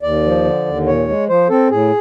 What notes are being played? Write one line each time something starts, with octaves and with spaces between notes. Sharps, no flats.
D#2 D5
F3
D3
D#2
A#2 C#5
G#3
F3 C5
C4 A4
A2 G#4